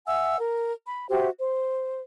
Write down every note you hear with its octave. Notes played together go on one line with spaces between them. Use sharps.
E5 F#5 G#5 E6
A#4
B5
F#4 G4 C5 E5
C5